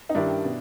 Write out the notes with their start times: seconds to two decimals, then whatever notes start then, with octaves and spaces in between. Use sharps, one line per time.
0.09 D#4
0.15 G2 D#3 G3 D4 E4
0.44 B2